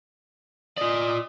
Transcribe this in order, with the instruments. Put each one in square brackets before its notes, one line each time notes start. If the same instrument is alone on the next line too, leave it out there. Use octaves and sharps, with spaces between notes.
[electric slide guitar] F4 D5 [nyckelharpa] D#5